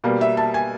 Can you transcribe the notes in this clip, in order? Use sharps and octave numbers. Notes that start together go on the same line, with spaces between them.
B2 G3 A#3
E5
A5
G#5